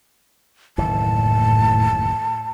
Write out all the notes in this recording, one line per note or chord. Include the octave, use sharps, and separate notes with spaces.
F#1 D#2 A2 E3 A5